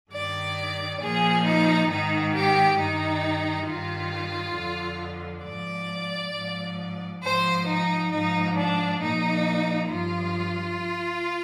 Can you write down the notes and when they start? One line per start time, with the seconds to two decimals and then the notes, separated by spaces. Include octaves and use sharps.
0.11 G2 D#3 D5
1.00 A#2 F3 G#4
1.45 D#4
1.89 G#2 D#3 D#4
2.34 G4
2.78 G2 D#3 D#4
3.67 G2 D#3 F4
4.56 F2 D3 F3
5.45 G#2 F3 D5
6.34 G#2 F3
7.23 G#2 F3 C5
7.67 D#4
8.11 G#2 F3 D#4
8.56 D4
9.00 A#2 F3 D#4
9.89 G2 F3 F4